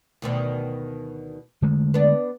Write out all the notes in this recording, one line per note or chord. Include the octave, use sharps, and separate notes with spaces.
D2 B2 D#3
D3 G#3 A3
B3 D4